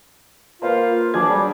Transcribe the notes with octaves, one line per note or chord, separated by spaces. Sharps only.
A#3 F4 B4 C5
F#3 D4 G#4 G#6
G3